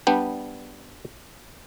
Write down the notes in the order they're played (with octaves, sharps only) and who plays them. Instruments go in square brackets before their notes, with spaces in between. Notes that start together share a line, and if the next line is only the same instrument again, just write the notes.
[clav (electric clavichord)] G3 B3 D4 G4